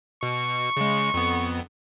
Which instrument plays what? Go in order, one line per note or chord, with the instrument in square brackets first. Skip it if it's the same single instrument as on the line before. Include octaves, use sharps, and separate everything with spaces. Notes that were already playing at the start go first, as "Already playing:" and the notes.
[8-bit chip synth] B2 [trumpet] C#6
[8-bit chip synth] C#3 G#3
F2 B3